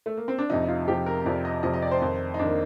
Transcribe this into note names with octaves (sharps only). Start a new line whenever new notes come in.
A3
A#3
C4
D4
F2 C3 F3 D#4
D#4
F4
F2 C3 F3 G4
A#4
F2 C3 F3 D5
D#5
F2 C3 F3 D#5
D#5
D5
C5
F2 D#3
D#4
F2 D#3 D4
A#3